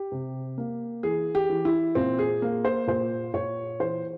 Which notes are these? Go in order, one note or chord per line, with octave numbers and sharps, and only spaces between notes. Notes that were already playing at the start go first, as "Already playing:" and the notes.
Already playing: G4
C3
A#3
E3 G#4
G4
E3
E4
A#2 C4
G#4
A#3
C5
A#2 C5
A#2 C#5
E3 C5